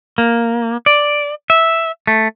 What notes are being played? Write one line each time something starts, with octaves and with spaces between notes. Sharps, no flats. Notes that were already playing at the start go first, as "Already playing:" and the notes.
A#3
D5
E5
A3